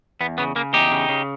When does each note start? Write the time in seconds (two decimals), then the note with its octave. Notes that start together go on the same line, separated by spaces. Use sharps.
0.21 E2 B3
0.38 C#3 B3
0.56 C#3 A#3
0.73 E2 D#4 G4
0.91 C#3
1.09 C#3